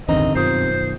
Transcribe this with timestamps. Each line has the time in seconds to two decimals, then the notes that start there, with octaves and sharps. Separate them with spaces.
0.08 A1 E2 G2 D3 D#3 C4 D#5 A#5
0.35 F#2 B2 D#3 F4 C5 D#6